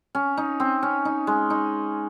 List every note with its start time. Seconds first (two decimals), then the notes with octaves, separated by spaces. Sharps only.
0.15 C#4
0.37 D#4
0.60 C4
0.83 C#4
1.05 D#4
1.27 G#3
1.50 D#4